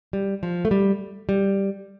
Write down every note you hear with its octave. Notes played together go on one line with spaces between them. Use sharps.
G3
F3
A3
G3
G3